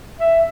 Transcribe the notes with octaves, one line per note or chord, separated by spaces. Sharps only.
E5